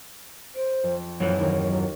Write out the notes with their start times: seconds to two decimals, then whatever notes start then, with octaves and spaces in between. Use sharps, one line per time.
0.55 C5 D7
0.83 F2
1.20 F#2 E3 F3 C#5 F#6 G6
1.39 D#2 F3
1.65 F#3